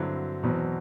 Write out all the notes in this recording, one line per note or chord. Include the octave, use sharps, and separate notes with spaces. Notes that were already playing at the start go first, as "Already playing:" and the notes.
Already playing: G2 D3 F#3 C4 E4
E2 B2 F#3 C4